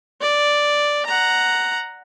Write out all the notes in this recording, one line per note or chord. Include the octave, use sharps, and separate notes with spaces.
D5
F#5 A#5